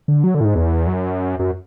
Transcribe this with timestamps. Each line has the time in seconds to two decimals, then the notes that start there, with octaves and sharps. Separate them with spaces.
0.08 D3
0.24 F#3
0.35 D3
0.41 A2
0.45 G#2
0.55 E2
0.87 F#2
1.39 F#2